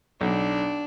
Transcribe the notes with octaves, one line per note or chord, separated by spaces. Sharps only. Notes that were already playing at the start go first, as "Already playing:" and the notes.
B1 D4